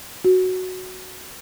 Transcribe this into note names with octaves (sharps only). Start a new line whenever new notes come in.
F#4